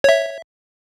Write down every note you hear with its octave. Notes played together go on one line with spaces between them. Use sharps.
C#5 E5